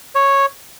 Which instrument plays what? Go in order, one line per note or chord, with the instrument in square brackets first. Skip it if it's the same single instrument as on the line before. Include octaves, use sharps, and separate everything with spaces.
[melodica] C#5